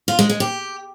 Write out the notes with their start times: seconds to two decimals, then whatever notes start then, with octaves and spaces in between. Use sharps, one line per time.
0.08 F4
0.19 G#3
0.29 G#3
0.40 G4